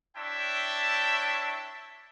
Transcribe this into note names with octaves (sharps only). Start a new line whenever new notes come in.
D4 E4 C#5 E5 G5 A5